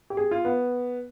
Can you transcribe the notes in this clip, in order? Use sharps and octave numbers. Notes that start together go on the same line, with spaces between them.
G4
G#4
F4
B3